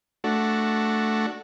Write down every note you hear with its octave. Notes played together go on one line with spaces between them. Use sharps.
A3 D4 F#4